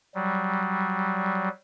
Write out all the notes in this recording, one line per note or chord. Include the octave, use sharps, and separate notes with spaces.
F#3 G3